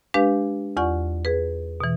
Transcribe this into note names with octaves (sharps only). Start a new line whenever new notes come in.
G#3 D4 G4 B4 F5
E2 F4 D5 F#5 C#6
G#4 B4
B2 E3